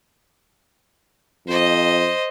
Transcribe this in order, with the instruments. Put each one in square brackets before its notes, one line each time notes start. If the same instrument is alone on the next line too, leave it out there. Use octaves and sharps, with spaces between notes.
[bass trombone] F2 [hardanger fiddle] C5 D#5